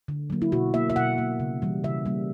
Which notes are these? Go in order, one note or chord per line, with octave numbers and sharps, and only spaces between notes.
D3
F#3 A#3
E4
B2 F#4
A#3 E5
E5
B2 F#5
A#3
C#3
E3 G3
C#3 E5
G3 A#3